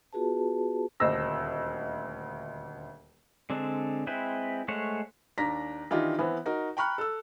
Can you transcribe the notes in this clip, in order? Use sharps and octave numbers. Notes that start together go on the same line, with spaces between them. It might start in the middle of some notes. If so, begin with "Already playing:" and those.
B3 F4 F#4 G#4 B4 A5
D#1 D2 C5 D#5 E6 A#6
D3 G#3 C4 D4
G#3 C4 E4 B4 C5
G#3 A3 C5 C#5 F#5
D#2 D4 A#5 A#6 B6
D#3 E3 D4 D#4 F4 G4
E3 B3 C4
D#4 F#4 A#4
G5 A#5 B5 C#6 F6 F#6
A4 E6